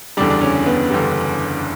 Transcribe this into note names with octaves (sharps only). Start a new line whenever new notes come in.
F#1 E2 D3 G3 D4
D4
C#4
B3
F#1 E2 D3 G3